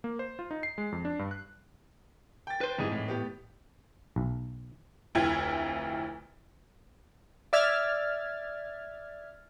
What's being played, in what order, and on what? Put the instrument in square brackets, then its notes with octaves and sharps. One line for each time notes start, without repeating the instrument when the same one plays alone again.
[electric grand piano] A#3
C5
F4
D#4
C7
G#3
F2
D4
G2
F#6
[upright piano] G5 A6
[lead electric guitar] B4 C5
[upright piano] F2 G#2 E3 [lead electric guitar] G3 G#4
[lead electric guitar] A2
[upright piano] B3 G4
[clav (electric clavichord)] B1
[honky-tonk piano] F1 D2 E4 F4 G5 G#6
[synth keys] D5 E5 F6 G#6 A6